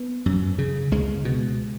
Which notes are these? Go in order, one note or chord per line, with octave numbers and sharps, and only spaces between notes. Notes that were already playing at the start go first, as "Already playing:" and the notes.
Already playing: B3
F#2
C#3
C#2 G#3
B2